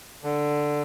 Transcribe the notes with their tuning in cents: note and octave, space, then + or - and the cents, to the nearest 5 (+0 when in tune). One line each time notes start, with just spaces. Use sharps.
D3 +5